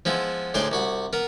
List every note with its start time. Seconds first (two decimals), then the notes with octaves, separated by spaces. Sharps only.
0.05 F3 G#3 B3 E4
0.54 D2 A2 G#3 D5 C6 D6
0.72 C2 F#4 B5
1.13 B3 A#4